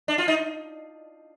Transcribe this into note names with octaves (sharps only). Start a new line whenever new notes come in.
D4
F4
D#4